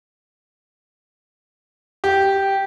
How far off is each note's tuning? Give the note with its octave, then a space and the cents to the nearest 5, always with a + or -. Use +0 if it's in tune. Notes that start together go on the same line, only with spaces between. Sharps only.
G4 -5